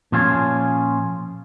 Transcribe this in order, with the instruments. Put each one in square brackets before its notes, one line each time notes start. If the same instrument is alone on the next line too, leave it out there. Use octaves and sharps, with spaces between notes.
[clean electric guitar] A#2 F3 C#4 F4 G#4